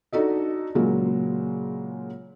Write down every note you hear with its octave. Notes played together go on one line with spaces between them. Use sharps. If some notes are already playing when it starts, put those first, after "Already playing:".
D4 D#4 F#4 A4 D#5
A#2 C#3 F#3 G#3 A#3 F4